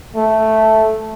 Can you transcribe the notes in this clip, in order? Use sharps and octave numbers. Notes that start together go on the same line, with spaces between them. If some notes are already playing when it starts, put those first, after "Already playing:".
A3